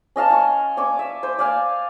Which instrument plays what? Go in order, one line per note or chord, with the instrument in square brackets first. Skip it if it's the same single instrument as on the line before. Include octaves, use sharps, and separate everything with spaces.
[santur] C#4 D#5 F5 A5
G#5 C#6
D5 G#5 C#6 D6
E5
C5
D5 F5 G#5